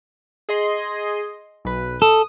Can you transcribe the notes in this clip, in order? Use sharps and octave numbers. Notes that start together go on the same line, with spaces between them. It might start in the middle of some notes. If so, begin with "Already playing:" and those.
G#4 D#5 C6
B1 B4
A4 D#6